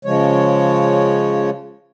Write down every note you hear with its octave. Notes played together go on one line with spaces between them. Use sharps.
C#3 F3 G#3 C#5